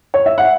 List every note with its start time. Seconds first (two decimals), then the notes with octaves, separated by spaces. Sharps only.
0.14 C#5
0.26 E5
0.38 F#5